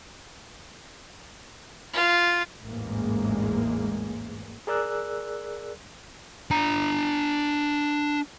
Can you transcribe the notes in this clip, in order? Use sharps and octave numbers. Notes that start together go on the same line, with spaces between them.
F4
A1 E2 G#2 G#3 A#3
G#4 A#4 D5 E6 F#6
D4 A#5